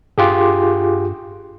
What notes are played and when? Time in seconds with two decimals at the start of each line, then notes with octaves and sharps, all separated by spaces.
0.18 G2 F4 G4 G#4